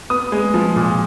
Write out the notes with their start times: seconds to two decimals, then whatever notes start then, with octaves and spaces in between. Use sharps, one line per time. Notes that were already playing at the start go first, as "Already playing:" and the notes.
0.10 B3 D#6
0.32 G#3
0.54 F3
0.76 A#2